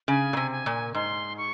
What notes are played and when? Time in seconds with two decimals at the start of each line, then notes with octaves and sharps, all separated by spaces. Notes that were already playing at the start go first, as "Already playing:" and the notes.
0.08 C#3 G#5
0.33 A#2
0.37 C3
0.51 G#5
0.66 A#2
0.94 G#2 C6
1.38 C#6